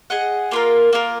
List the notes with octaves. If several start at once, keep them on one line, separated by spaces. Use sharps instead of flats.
G#4 D#5 F#5
A#3 F4 A#4
A#3 F4 A#4